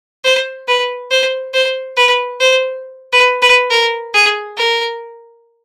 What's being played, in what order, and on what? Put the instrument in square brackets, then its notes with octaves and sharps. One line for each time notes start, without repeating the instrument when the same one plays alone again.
[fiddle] C5
B4
C5
C5
B4
C5
B4
B4
A#4
G#4
A#4